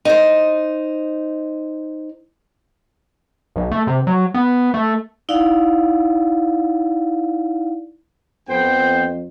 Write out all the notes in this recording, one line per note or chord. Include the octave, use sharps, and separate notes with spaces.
D#4 C5
B1
A3
C3
F#3
B3
A3
D#4 E4 D5 F5 F#5
F2 B3 C5 G5